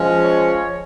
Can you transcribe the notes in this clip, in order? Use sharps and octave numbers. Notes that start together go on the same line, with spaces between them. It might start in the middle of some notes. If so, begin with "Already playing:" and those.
Already playing: F3 G#3 C#4
C#5